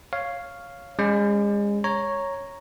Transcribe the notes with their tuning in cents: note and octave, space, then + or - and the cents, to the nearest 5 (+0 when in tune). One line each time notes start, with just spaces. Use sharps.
C#5 +0 F5 +0
G#3 -30 C#4 +0
C#5 -5 A#5 +0